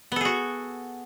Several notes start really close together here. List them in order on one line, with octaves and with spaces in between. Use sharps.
B3 A4 G#4 F#4